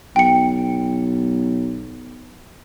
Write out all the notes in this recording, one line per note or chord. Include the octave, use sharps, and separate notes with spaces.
B1 G5 C#7